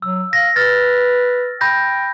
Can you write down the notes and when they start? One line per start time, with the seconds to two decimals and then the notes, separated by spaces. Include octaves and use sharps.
0.02 F#3 E6
0.33 F5 A#6
0.56 B4 F6 A6
1.61 G5 B5 G6 A#6